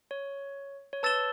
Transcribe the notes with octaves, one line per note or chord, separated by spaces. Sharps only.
C#5
C#5
B4 A5 E6 A6 E7 G7